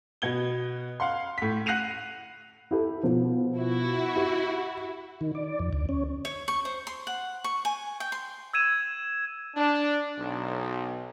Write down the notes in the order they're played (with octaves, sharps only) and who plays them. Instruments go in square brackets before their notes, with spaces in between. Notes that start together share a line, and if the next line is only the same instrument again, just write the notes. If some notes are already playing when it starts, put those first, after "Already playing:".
[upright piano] B2 B3 G#6 G7
F5 F#5 C6
A2 B6
F#5 F#6 A#6 C7 D#7 F7
[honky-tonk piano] E4 G4 A4
B2 F3
[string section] E4 F#4
[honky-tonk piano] G4
[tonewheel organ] D#3
D5
F2
D2
C#4
[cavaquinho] C#5
C#6
C5
C6
F#5
C#6
G#5
G5
C6
[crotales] E6 G#6 D#7 E7
[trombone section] D4
B1